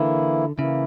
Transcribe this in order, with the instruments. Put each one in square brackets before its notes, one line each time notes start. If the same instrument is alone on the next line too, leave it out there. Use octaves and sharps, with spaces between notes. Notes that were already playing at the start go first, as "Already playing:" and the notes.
Already playing: [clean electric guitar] D3 [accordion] E3 A#3 E4
[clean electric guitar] C#3 [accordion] E3 A#3 E4